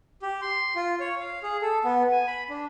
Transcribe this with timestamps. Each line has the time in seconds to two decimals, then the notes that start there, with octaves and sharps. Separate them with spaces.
0.22 G4
0.42 C6
0.76 F4
1.00 C#5
1.20 F5
1.43 G#4
1.62 A4
1.84 B3
2.12 G#5
2.27 B5
2.50 D4